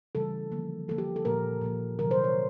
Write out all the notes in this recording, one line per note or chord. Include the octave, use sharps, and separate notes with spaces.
C#3 E3 G3 A4
D3 F3 A#3
D3 F3 A#3 A4
G4
A4
A#2 F3 A#3 A#4
A#2 F3 A#3
C3 D#3 F#3 A#4
C5
C#5